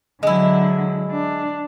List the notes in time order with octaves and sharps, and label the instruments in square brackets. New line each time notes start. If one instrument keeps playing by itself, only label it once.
[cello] D3 F#3 [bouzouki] G#3 E4
[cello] D4